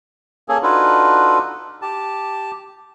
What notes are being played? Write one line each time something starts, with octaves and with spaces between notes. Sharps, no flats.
A#3 C#4 G#4 A4
D4 D#4 F4 F#4 A4 B4
G4 A5